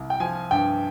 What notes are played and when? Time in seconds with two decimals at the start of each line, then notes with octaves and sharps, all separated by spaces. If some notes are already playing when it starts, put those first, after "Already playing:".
Already playing: C2
0.10 G5
0.20 F3 G#5
0.51 G2 G5